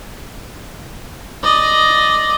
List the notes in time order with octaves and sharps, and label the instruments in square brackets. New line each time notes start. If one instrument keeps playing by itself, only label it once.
[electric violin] D5 D#5